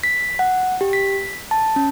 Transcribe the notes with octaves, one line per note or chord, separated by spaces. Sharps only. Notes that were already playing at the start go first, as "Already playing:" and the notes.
B6
F#5
G4
B6
A5
C#4